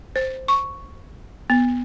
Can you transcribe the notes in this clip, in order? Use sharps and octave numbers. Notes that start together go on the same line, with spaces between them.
C5
C#6
B3